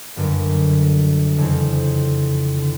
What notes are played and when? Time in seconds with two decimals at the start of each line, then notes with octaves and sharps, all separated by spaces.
0.16 G1 F#2 D3
1.37 F2 C#3 E3
2.58 D3